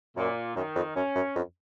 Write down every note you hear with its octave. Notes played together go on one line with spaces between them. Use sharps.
F#2 A#2
F#2 D#3
F2
F#2 C#4
F#2
F2